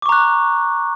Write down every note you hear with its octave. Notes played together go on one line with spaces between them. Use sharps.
A#5 C#6 D6 F#6